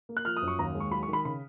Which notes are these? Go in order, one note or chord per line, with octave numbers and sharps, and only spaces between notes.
A#3
F#6
F3 F6
D#6
F#2
C#6
D#2 A#5
G#3
C#6
F#3 B5
C#6
D#3 B5
C#3 B5